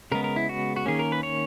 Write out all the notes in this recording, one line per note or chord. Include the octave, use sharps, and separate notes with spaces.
C#3 G#3 B3 A#4
A#4
E4
F#4
F#4
D#3 A#3 C#4 G#4
A#4
B4
C#5